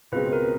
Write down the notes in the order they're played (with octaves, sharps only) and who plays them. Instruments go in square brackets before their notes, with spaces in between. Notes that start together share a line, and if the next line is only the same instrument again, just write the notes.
[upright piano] C#2 B2 G#3 C4 [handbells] B4
[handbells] A#4